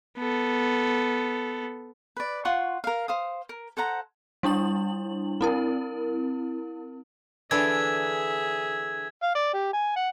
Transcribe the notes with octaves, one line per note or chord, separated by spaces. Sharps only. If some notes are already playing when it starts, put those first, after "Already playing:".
B3 A4
B4 D5
F4 F#5 C6 C#6
A#4 F5
C5 F5 D#6
A#4
A4 C5 F#5 A#5
G3 D4 E4 F#7
C4 E4 A#4
D3 E3 D4 G#4 E5 G#6
F5
D5
G4
G#5
F#5